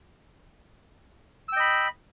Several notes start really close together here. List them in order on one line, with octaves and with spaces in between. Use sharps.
E6 G5 D#5 B5